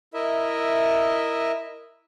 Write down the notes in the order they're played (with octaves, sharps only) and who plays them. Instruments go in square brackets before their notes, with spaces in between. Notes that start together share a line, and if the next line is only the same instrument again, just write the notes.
[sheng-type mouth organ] E4 A#4 D#5 E5